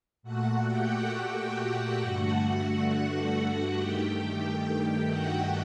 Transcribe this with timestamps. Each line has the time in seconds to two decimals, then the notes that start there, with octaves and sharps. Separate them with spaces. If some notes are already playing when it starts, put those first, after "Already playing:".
0.23 A#2 A3 F#4 F#5
0.67 G4 G5
1.11 F#4 F#5
1.55 G4 G5
1.99 G2 D3 A3 F#4 F#5
2.43 F#4 F#5
3.75 G2 D#3 A3 G4 G5
5.07 F#4 F#5